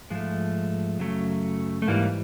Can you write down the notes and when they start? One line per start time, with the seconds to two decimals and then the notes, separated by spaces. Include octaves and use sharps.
0.10 G#2 F3 G#3 A3
0.99 F#2 C#3 F#3 A3
1.82 A3
1.87 G#2 E3 G3 A#3